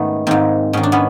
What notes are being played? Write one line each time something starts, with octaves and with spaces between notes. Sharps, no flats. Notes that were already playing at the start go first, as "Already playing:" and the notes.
Already playing: G#2 D#3 A3 B3 C#4
G#2 D#3 A#3 C4
G#2 D#3 C#4
D4
B3 C#4